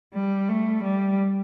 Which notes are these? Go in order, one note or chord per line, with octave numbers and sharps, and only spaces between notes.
G3
A3
G3